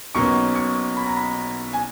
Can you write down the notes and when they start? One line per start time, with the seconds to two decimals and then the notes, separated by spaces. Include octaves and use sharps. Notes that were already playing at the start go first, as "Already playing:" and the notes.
0.15 B1 B2 A#3 C#4 C#6
0.55 C#6
0.97 B5
1.06 A#5
1.17 B5
1.73 G#5